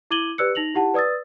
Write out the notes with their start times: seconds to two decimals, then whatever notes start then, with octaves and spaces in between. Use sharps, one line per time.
0.11 E4 D6 G#6 D#7 F#7 G7
0.38 G4 B4 D5 E6 F#6 C#7
0.55 D#4 A#6 F7 F#7
0.74 E4 G4 F#5 A5
0.94 B4 D5 D#6 E6 A6